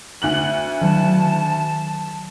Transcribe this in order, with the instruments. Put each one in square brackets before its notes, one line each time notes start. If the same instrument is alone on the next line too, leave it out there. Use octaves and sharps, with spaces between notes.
[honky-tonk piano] D2 F#6 F#7
[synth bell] D#3 F#3 [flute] A5